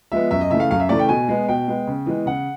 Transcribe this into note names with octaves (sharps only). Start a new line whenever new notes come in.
F3 G#3 B3 E5
F#2 E5
D#5
C#3 E3 A3 E5
F5
F#2 F5
E5
C#3 E3 A3 D5
G5
B2 G#5
G#3 B3
B2 G5
G#3 B3
C#3
E3 G#3 B3
C#3 F#5